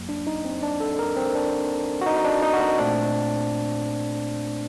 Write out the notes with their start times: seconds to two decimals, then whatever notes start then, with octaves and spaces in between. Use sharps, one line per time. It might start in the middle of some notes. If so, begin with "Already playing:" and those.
Already playing: F#2 F#3 A#3
0.09 D4
0.27 D#4
0.45 C4
0.63 D4
0.80 A4
0.99 A#4
1.16 C4
1.35 D4
2.01 F#4
2.06 D#4
2.17 D#4
2.25 D4
2.42 D#4
2.53 F#4
2.60 D#4
2.78 A#2 A3 C4 D4